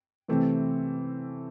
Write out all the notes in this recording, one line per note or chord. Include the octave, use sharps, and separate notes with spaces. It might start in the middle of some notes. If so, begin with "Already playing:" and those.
C3 E3 A3 C4